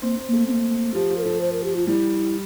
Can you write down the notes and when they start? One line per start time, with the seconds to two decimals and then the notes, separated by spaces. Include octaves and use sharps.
0.02 A#3 C4
0.17 C4
0.28 A3 A#3
0.48 C4
0.51 A#3
0.94 F3 G4
1.10 F3
1.18 A#4
1.22 F3 A4
1.41 C5
1.52 A#4
1.64 G4
1.76 F4
1.87 G3 E4